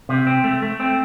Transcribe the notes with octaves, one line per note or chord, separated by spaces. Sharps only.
C3
C4
A3
A3
C4